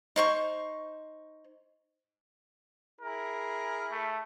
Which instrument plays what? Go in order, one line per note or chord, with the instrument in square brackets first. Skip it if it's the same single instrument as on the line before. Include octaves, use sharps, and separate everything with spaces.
[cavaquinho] D#4 C5 C#6
[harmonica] E4 G#4 [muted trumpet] A#4
[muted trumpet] A3